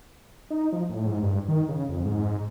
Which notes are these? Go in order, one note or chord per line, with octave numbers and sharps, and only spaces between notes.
D#4
F3
A2
G#2
G2
D#3
C#3
F2
G#2